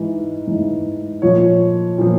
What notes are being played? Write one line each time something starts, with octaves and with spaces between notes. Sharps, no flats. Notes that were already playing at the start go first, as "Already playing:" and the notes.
Already playing: G#2 E3
G#2 E3
A#2 F3 C#5
A#2 F3